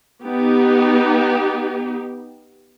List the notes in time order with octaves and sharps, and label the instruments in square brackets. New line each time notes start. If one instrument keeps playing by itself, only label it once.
[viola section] B3 D#4 G4